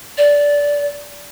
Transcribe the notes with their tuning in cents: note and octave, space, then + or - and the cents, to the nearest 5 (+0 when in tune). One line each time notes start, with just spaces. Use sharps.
D5 -15